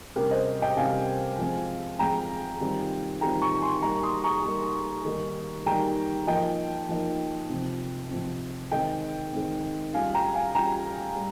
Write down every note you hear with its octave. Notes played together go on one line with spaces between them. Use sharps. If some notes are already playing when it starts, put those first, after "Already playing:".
C3 G3 C#4 G4 A#4
C5 D#5
D#5 G5
C3 G3 C#4 F5 G#5
F3 G#3 C4
F3 G#3 C4 G5 A#5
D#3 G3 C4 F4
D#3 G3 C4 F4 G5 A#5
A#5 C#6
G#5 C6
G3 A#3 D#4 A#5 C#6
C6 D#6
A#5 C#6
G3 A#3 D#4
D#3 G3 A#3 D#4
D#3 G3 A#3 D#4 G5 A#5
F3 A#3 D#4 D#5 G5
F3 A#3 D#4
C3 F3 C4
C3 F3 C4
D#3 G#3 C4 D#5 G5
D#3 G#3 C4
G3 C#4 F4 F5 G#5
G5 A#5
F5 G#5
G3 C#4 F4 G5 A#5
G3